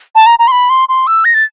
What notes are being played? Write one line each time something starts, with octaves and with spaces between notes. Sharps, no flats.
A5
A#5
A#5
C6
B5
C6
C6
E6
A#6
A6